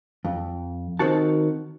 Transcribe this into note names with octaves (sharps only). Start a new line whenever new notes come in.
F2
D#3 C4 F#4 A5